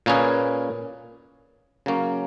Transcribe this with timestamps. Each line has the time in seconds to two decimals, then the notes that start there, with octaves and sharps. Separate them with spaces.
0.06 A#2 A#3 C#4 G#4 B4
1.86 C#3 F#3 A#3 C#4